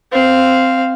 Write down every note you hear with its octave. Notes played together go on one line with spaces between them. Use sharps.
C4 F5